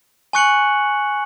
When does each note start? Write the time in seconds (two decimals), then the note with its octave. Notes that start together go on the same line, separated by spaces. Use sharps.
0.33 G#5 C#6 F#6 C#7 F#7